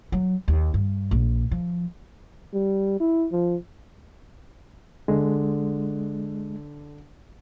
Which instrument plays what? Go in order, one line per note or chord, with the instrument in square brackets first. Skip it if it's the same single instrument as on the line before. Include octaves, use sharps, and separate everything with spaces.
[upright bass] F#3
D#2
G2
A#1
F3
[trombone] G3
E4
F3
[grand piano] D3 [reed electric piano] G#3